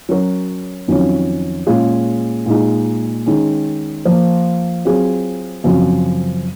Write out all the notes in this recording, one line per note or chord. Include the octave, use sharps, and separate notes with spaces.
F#3 C#4 F#4 A#4
F2 D#3 F#3 C#4 F4
A#2 G#3 C#4 F4 G#4
A#2 G#3 D#4
D#3 G#3 C#4
F3 A#3 F4 C5
F#3 C4 F4 G#4
F#2 C#3 F3 C4 F#4